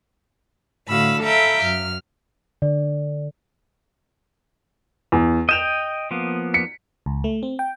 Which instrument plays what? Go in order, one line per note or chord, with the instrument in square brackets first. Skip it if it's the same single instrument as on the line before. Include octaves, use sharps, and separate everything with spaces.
[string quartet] A2 D3 F#4 F5 B5 E6
A4 E5 F5 G5 A#5 B5
F#2 F6
[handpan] D3 [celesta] D5
[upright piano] E2
[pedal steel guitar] D#5 G5 [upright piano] G6 E7 F7
[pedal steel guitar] F3 A#3 B3
[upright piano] B6 C#7
[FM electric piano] C#2
A3
C4
G5